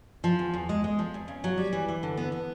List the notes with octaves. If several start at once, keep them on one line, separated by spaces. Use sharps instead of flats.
F3
E2
E2
G#3
G#3
F3
E2
C#3
F#3
G3
E3
E3
D3
B3
B3